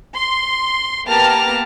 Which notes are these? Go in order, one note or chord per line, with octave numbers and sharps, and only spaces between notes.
C6
A#3 B3 G4 A5 A#5 F6